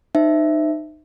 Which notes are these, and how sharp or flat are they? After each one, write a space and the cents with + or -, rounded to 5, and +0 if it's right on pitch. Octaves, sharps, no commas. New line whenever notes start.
D#4 -25 C5 -15 E5 +0